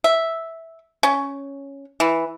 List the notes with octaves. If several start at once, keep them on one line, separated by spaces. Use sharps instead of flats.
E5
C#4
E3